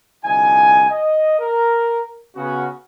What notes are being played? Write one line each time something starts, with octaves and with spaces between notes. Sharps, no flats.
C2 D3 F3 D#4 G#5
D#5
A#4
C#3 B3 C#4 F#4